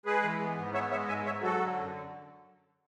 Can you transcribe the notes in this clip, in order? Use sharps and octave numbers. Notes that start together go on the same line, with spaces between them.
G#3 G#4 B4
E3
B3
G#2
B3 C#5 E5
G#3 C#5 E5
G#2 E5 G#5
G#2 C#5 E5
F#3 F#4 A4
D3
F#2